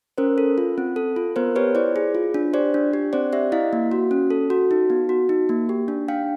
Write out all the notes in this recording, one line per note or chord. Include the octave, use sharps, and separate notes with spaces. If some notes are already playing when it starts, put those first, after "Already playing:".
C#4 A#4 C5
A4
F4
C4
A4
F4
B3 A#4 C5
G4 B4 C#5
E4 C5 D5
G#4
F4
D4
G4 C5 D5
D4
G4
C4 C5 D5
G4 D5 E5
E4 D#5 F5
A#3
F#4
C#4
A4
F#4
D#4
B3
F#4
D#4
A#3
G4
D4
D4 F5 G5